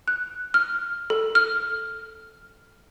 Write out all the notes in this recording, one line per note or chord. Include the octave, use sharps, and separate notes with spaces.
F#6
F6
A4
F6